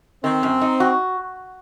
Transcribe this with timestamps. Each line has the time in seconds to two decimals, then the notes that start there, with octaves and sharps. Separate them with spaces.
0.24 D#3 C4
0.43 F#2
0.62 D#4
0.80 F#4